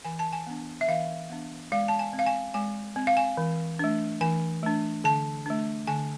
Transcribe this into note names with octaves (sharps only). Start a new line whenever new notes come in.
E3 G#5
A5
G#5
B3 D4
E5
E3 F5
B3 D4
G#3 F5
A5
G#5
C4
F5
G#5
G#3 G#5
C4
F5
G#5
E3
A3 D4
E3 G#5
A3 D4
D3 A5
A3 D4
D3 G#5